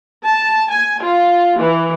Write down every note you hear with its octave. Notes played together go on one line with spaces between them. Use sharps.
A5
G#5
F4
E3